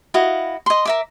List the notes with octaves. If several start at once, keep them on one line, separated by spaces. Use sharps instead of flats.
E4 F#4 D#5 F5
D#5 C6
A#4 E5 D6